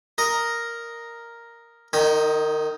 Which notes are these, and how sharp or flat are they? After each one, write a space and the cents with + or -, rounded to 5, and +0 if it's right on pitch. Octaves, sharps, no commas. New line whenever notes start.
A#4 +0 D#5 +0
D#3 -25 D#4 +20